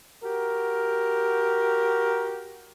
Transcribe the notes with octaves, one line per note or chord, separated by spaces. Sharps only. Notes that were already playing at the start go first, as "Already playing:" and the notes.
F#4 G4 A#4